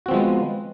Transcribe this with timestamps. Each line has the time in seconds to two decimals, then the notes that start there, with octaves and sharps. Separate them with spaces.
0.06 F#4
0.08 C4
0.11 F3
0.14 G#3
0.16 B3